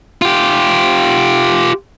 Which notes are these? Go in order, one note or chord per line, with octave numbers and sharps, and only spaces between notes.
F4 G4